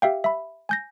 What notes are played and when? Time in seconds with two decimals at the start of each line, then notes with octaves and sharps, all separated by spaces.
0.02 G4 E5 F5 G5
0.24 E5 B5
0.69 G#5 G6 A#6